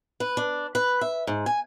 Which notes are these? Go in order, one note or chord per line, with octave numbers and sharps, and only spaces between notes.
B4
D4
B4
E5
G#2
G#5